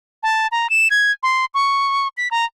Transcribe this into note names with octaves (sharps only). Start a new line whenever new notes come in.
A5
A#5
E7
G#6
C6
C#6
B6
A#5